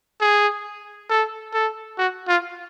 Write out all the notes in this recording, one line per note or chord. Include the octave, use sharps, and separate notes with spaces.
G#4
A4
A4
F#4
F4